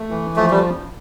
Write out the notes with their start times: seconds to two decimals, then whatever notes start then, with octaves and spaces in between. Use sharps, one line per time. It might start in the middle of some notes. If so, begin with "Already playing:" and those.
Already playing: A3
0.11 E3
0.36 F3 A3
0.50 G3